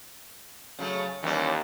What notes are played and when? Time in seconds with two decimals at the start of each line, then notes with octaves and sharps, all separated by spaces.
0.79 C#3 F#3 A3
1.23 D#2 E3 G3 C#4